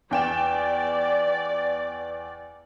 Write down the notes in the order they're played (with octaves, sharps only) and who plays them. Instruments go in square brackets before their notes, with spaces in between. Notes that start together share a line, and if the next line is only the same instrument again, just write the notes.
[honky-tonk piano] E2 G5 E7 [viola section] D5